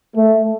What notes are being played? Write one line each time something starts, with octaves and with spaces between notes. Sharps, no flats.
A3